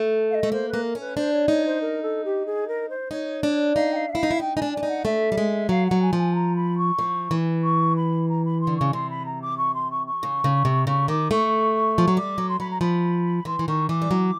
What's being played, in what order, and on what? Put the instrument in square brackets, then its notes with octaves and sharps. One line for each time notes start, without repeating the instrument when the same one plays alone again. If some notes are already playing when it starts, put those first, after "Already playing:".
Already playing: [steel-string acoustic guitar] A3
[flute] F5
D#5
[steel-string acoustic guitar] A3
[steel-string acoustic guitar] A#3 [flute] C5
[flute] B4
[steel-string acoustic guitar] A#3
[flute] A#4
[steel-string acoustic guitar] C#4
[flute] B4
[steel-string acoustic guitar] D4 [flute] C5
[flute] C#5
[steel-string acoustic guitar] D#4 [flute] C#5
[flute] C5
A#4
A4
G4
G#4
A#4
C5
[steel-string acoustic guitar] D#4 [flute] C#5
[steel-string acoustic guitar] D4
[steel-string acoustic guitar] D#4 [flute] F5
[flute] G5
F5
E5
[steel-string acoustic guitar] E4 [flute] F5
[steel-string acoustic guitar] D#4
E4
[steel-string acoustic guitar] D#4 [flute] G5
[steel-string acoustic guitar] D#4 [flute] G#5
[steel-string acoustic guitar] D4
[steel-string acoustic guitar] D4 [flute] G#5
[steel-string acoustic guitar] D#4
[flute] F#5
[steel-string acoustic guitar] A3 [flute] E5
[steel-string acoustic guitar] G3
G#3
[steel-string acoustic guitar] F#3 [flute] F5
[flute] F#5
[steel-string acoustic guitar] F#3
[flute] G#5
[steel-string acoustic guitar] F3
[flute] G#5
A#5
B5
C#6
[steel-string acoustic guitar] F3
E3
[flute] C#6
B5
A#5
B5
C6
[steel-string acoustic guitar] D3
[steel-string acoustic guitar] C#3 [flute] C#6
[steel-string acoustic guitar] C3 [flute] C6
[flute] B5
A#5
D6
C#6
C6
C#6
C#6
[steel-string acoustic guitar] C#3
C#3
C3
[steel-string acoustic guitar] C#3 [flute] C#6
[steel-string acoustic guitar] D#3 [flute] D6
[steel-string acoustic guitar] A3 [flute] C#6
[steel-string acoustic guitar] F3
F#3
[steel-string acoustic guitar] G3 [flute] D6
[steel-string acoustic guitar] F#3
[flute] C6
[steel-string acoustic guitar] F#3 [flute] B5
[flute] A#5
[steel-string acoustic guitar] F3 [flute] B5
[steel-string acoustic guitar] E3 [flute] C6
[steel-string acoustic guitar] E3
[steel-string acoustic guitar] D#3 [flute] C#6
[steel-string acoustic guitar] E3 [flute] D6
[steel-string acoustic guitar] G3
F#3